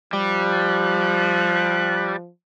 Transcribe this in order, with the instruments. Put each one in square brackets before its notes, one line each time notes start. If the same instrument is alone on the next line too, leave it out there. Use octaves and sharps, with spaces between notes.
[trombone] F3 [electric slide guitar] G3 [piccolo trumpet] F#6